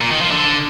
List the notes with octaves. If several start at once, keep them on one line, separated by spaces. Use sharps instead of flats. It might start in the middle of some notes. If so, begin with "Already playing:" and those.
A#2
D#3
F3
D3